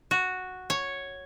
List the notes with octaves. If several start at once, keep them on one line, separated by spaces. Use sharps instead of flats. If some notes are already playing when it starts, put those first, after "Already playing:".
F#4
C#5